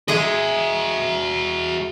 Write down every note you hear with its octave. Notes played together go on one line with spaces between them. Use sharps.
G#3 F#4 G#4 D#5 E5